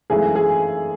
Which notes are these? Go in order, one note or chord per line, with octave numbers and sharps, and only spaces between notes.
G#1 F#2 E3 A3 G#4
G#4